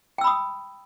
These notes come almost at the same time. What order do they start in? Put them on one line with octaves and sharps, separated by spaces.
G5 E6 B5 D#6